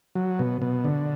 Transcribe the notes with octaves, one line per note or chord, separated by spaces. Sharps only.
F#3
B2
B2
D3